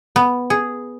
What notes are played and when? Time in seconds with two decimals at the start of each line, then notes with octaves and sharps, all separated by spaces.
0.16 B3
0.50 G#4